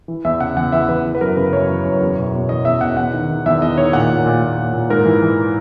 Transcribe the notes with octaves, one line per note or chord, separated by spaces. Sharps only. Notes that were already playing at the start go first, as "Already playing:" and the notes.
E3
E2 E5
C#3 F#5
E2 F#5
E3 E5
E2 B4
E3
B4
F#2 A#4
C#3 B4
F#2 C#5
E3
F#2
E2
B2
B2
E2 D#5
E2 E5
B2 F#5
E2 F#5
D#3
D#3
E2 E5
E2 D#5
D#3 C#5
A#2 F#5
A#2
A#2
A#2
A#2
A#2
G#2 A#4
E3
E3